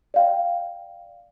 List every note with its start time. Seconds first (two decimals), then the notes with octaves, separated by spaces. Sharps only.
0.14 D5 F5 G5